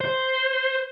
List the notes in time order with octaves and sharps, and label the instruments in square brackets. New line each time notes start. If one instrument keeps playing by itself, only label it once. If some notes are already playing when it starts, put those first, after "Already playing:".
[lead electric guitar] C5